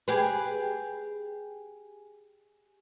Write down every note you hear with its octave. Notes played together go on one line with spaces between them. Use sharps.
G4 G#4 B4